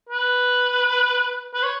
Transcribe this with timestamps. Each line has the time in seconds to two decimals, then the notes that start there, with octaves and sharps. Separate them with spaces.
0.09 B4
1.54 B4
1.63 C#5